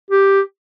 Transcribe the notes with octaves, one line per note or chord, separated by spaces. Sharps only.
G4